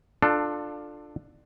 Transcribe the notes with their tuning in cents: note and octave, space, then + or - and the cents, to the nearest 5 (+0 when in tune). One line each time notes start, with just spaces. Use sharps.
D4 +15 F4 +10 A4 +0